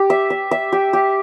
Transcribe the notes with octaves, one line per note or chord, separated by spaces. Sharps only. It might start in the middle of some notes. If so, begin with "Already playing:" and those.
Already playing: G4
E5
E5
E5
G4
G4